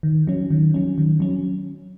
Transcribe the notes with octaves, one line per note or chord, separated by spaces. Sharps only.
D#3
F#3 C#4
D#3
F#3 C#4
D#3
F#3 C#4